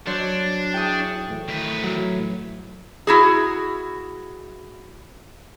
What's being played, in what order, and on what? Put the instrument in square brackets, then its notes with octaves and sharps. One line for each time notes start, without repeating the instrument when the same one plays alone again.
[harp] F#3 C5 C#5 [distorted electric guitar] D4
[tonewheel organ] E4 G#4 C#6 [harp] G5 D#6
[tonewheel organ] A2 E3 A3
[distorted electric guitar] D#3 B4
[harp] F#3
[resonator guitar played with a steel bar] E4 F#4 G#4